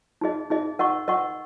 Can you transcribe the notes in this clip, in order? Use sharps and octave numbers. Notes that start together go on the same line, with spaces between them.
D#4 G#4 D#5
D#4 G#4 D#5
A#4 D#5 F#5 C#6
A#4 D#5 F#5 C#6